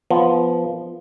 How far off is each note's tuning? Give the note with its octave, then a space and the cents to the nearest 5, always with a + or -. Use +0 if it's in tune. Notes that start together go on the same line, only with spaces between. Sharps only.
F3 -10 B3 +0